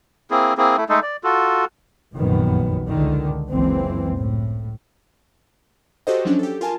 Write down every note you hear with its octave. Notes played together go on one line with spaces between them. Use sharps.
A#3 C4 E4 G#4
A#3 C4 E4 G#4
A3 E4
G#3 A3 D#4 A4
D5
F4 F#4 A4
F1 A#1 F#2 D#3 B3
C#2 D3 D#3
F#1 C#2 E3 C4
A2
F#4 G4 A4 C5 D#5
F3 F#3 C#4 D4
G4 A4
F4 A#4 G#5 A5